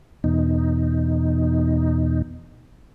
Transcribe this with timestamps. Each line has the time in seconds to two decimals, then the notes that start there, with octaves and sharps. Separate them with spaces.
0.24 E2 B2 D#4